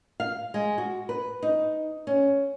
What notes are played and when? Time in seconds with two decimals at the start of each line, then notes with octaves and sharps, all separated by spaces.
0.20 F5
0.54 G#3
0.78 F#4
1.09 B4
1.43 D#4
2.07 C#4